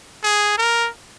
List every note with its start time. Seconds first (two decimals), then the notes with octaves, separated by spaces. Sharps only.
0.24 G#4
0.58 A#4